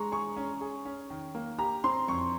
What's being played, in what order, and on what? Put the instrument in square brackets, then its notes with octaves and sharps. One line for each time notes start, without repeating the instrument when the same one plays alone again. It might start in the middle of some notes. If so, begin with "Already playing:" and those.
Already playing: [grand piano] G#3 [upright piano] A#5 C#6
[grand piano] G#4 [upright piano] C#6
[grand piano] C#4
G#4
C#4
D#3
A#3
[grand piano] G4 [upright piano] A#5
[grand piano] C4 [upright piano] C6
[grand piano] F2 [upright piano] C#6